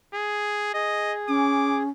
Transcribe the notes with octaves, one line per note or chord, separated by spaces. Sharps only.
G#4
G#4 D#5
C#4 D6